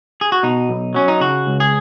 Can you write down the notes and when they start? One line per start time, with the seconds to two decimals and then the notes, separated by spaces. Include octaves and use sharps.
0.21 G#4
0.32 F#4
0.43 B2 D#4
0.69 B1
0.94 F#3 C#4
1.08 D#4
1.20 C#3 F#4
1.47 C#2
1.60 G#4